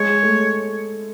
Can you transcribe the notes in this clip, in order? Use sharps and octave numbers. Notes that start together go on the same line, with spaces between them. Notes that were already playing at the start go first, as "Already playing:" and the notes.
Already playing: G#3 C#5
A3